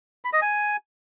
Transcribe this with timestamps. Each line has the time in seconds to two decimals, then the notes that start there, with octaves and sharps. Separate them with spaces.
0.25 B5
0.33 D#5
0.42 G#5